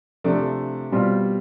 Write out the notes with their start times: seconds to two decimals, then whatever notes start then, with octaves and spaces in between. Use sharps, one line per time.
0.24 C3 F3 A3 D4
0.92 B2 G3 C4 F4